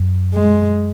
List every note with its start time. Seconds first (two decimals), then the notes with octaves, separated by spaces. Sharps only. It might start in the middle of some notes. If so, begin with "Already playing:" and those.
Already playing: F#2
0.34 G#3